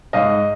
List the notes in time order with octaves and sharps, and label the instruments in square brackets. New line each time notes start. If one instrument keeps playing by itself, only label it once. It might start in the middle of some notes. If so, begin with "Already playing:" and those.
[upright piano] G#2 D#5 F5